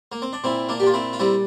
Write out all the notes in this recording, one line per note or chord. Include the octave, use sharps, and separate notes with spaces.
A#3
C4
D4
A#2 C4 E4
A#3 D4
G4
A#2 F4
C4 E4
F4
G3 C4 E4